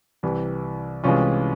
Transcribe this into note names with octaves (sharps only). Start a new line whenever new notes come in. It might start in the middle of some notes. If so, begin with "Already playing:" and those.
C2 C3 E3
C2 C3 E3 G#3 C#4 F4